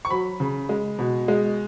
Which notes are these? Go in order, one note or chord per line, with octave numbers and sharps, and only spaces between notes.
C#6
F#3 B5
C#3
G#3
B2
G#3